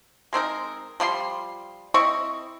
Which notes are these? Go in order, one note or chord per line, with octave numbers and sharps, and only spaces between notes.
G#3 C4 D#4 A#4
F3 G3 E4 C6
C4 E4 D#5 C#6